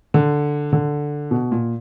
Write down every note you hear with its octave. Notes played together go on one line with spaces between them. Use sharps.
D3
D3
B2
A#2